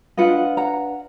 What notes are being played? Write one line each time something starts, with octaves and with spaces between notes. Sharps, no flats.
D4 F4 B4 D#5 F#5
F#5 A#5